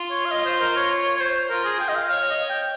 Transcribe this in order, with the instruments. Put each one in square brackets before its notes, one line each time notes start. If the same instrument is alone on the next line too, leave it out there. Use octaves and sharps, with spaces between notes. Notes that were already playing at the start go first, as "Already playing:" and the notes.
Already playing: [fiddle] F4
[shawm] C#5
F5
D#5
C5
A#4
C#5
C#5
C#5
C5
[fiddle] F4 [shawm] A#4
[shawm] G#4
G5
D#5
F5
[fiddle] C#5 [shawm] F5
[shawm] D#5
G5